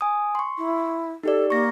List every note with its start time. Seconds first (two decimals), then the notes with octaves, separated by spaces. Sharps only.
0.01 G#5 D#6
0.35 C6 C#6
0.57 E4
1.23 D#4 G4 A4 D5
1.50 A#3 C#6 A#6